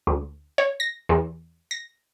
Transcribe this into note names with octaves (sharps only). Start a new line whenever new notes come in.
D2
C#5
A#6
E2
A#6